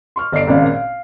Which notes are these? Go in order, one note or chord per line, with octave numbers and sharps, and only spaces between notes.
C6 C#6 F6
G1 D5 D#5 C7 D7
G#1 A#2 C#3 D5 F5
F5